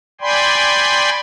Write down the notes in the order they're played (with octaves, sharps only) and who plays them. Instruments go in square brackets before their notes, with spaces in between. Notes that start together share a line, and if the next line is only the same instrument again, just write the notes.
[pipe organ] D5 G5 G#5 B5 C6